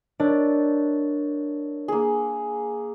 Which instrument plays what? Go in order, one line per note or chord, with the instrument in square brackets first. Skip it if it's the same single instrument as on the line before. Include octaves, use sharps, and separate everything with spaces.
[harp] D4 [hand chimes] A#4 C#5 D#5
[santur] A#3 G#4